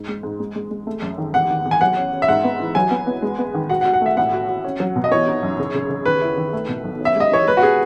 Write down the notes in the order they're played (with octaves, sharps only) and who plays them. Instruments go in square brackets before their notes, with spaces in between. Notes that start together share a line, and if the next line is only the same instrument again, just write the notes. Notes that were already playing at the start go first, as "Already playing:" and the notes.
Already playing: [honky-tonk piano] G#2
G#3
G#2
G#3
G#3
G#3
A3
F#2
D#3
[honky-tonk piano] E2 [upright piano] F#5
[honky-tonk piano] D#3
E2
[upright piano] G#5
[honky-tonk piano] F#3 [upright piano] F#5
[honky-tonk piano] C#4
C#4
[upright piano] E5
[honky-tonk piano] G#2 [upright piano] F#5
[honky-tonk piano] B3
E3
[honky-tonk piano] F#3 [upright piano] G#5
[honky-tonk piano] B3
B3
G#3
B3
D#3
[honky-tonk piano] F#4 [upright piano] F#5
[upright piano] F#5
[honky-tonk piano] F#4
[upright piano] F#5
[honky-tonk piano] A3 [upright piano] E5
[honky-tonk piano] A2 [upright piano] F#5
[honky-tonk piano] F#4
F#4
C#4
F#3
B2
[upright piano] D#5
[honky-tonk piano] E3 [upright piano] C#5
[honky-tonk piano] D#4
F#2
C#3
C#3
C#3
[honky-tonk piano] D#3 [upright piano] B4
[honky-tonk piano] E4
D#3
A3
B2
B1
C#4
[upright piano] E5
[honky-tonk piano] G#3 [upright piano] D#5
[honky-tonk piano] E3 [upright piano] C#5
[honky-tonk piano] G#3 [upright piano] B4
[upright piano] F#4
[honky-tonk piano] B3 [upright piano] G#4